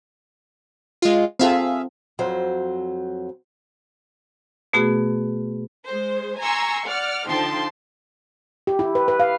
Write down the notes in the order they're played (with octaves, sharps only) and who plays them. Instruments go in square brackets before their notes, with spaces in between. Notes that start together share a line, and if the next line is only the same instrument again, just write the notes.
[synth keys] G#3 F4
[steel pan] C4 F4 A4 [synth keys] G#4 E5 F5
[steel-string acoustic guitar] F2 F#3 C5
[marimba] B2 A3 B3 F#4 G#4
[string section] G#3 C5
G#5 A#5 C6 C#6 E6
D5 F#5 F6
D3 F3 D#4 G5 A5 C6
[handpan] G4
E4
B4
B4
F5